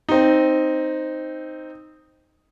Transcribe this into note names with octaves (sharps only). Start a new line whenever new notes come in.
C4 D#4